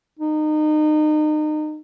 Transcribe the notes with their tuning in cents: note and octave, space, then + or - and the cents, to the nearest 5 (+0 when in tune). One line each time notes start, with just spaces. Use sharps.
D#4 -30